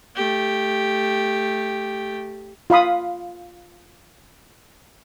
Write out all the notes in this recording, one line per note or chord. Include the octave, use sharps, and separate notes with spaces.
A3 G4
F4 F5 B5 D#6